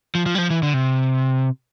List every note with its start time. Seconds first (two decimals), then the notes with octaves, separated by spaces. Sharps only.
0.15 F3
0.26 F3
0.35 G3
0.38 F3
0.50 E3
0.63 D3
0.74 C3